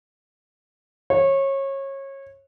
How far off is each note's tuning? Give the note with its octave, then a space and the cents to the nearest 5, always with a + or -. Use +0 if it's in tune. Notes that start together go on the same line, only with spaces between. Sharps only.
C#5 -25